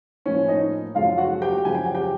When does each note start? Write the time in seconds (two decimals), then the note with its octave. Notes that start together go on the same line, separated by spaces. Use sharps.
0.26 A2 F3 A#3 C#4 C#5
0.48 D#4 D#5
0.95 F#2 C#3 F3 A3 F4 F5
1.18 F#4 F#5
1.42 G4 G5
1.65 F#2 C#3 F3 G#5
1.75 G5
1.86 F#5
1.95 G4 G5